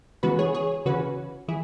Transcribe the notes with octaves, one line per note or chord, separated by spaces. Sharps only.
C#3 E3 G#3 B3 F#4 B4
G#4 C#5
G#4 C#5
C#3 E3 C#4 F#4 B4
E3 E4 G#4